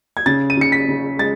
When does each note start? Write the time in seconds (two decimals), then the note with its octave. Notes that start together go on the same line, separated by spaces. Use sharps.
0.17 G#6
0.26 C#3 A6
0.50 D#7
0.57 C#3 C#7
0.72 B6
0.88 C#3
1.19 G#3 A6